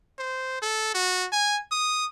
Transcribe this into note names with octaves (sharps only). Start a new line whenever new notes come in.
C5
A4
F#4
G#5
D#6